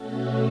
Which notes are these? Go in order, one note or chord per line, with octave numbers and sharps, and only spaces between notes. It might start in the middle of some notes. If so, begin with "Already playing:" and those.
Already playing: B2 A3 C#4 F#4 A4